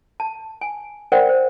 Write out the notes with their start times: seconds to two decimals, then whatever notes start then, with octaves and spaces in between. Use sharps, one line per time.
0.20 A5
0.61 G#5
1.12 A#4 C5 D5 F#5 G5
1.29 C5